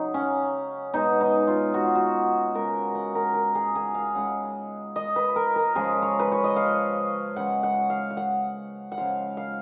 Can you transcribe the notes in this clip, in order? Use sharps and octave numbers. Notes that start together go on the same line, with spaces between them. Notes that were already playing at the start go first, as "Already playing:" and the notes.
Already playing: C#3 F#3 D#4
C#4
B2 G#3 D#4
D#4
F4
F#4
F4
F#4
C#3 G#3 A#4
F#5
A#4
A#4
G#4
G#4
F5
C#3 G#3 F#5
D#5
B4
A#4
A#4
C#3 F3 G#3 G#4
C#5
B4
C#5
D#5
F5
C#3 G#3 F#5
F#5
F5
F5
F#5
F#5
C#3 F3 G#3 F5
F5